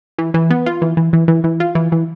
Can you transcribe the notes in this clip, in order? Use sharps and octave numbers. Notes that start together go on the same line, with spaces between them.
E3
E3
B3
F4
E3
E3
E3
E3
E3
F4
E3
E3